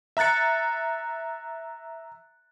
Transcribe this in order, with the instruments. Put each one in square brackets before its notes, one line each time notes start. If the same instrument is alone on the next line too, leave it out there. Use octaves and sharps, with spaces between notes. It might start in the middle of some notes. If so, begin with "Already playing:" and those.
[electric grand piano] E5 A#5 F#6 A6 C#7